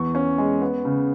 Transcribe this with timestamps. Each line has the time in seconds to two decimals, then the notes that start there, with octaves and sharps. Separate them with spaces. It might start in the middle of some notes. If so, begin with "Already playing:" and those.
Already playing: E2 C#6
0.15 C#4
0.38 G#3
0.62 B3
0.85 C#3